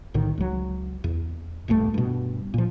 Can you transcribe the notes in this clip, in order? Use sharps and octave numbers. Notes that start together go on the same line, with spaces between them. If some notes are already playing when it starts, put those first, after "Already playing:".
B1 A2 D3 D#3
C#2 F#3
E2
D#1 B1 G2 A3
G2 B2
A#2 F3